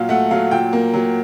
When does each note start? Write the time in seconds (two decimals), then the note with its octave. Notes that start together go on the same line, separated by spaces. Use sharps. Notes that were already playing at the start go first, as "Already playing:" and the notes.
Already playing: A#2 F#3 F5
0.09 A3 F#5
0.31 F#3 F5
0.51 A#2 G5
0.73 A#3
0.94 F#3